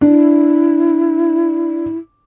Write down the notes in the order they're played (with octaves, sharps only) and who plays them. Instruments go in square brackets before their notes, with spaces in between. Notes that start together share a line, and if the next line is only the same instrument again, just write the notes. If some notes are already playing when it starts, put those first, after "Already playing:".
[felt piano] D4 [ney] E4